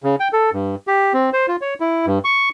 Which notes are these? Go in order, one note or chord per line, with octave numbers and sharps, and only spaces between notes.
C#3
G5
A4
G2
G4
C4
C5
F4
C#5
E4
G2
C#6